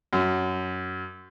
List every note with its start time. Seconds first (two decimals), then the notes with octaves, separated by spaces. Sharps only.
0.13 F#2